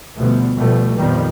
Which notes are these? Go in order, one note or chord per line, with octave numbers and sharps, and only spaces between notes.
D2 B2 F3 G3 A3 B3
B2 F3 G3 A3
F2 A#2 D#3 F3 G3 B3